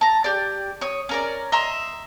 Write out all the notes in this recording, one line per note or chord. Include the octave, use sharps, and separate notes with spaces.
A5 A#5
G4 D5
C#5 D#6
C#4 A#4 D5
D#5 E5 A#5 C6